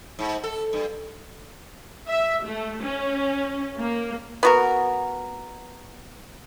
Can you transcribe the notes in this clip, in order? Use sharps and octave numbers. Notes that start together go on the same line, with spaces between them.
G#2
A4
G2
E5
A3
C#4
A#3
B3 F#4 A#4